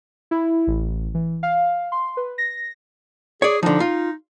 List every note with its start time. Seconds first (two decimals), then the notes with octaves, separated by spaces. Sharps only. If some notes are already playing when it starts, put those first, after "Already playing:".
0.31 E4
0.67 A1
1.14 E3
1.43 F5
1.92 C6
2.17 B4
2.38 A#6
3.42 G#4 C#5 D5
3.63 D3 F3 D#4
3.80 F4